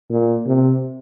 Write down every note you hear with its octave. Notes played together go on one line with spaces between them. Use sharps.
A#2
C3